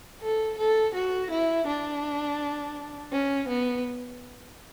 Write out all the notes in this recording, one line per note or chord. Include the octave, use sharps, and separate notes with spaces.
A4
A4
F#4
E4
D4
C#4
B3